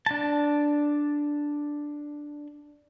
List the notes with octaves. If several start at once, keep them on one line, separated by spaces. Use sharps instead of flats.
D4 A5